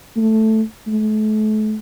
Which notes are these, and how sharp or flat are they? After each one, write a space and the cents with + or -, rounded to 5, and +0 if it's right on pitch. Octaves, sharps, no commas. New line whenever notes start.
A3 +0
A3 -35